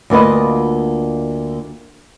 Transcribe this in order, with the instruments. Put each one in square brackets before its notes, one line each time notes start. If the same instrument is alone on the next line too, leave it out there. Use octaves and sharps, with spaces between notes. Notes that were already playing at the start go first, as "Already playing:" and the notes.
[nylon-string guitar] D2 A#3 F4 B4 D#5